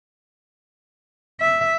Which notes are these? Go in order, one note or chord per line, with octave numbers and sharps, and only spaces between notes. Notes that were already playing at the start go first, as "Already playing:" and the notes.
E5